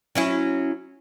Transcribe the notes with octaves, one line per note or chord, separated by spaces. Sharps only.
F#3 C#4 E4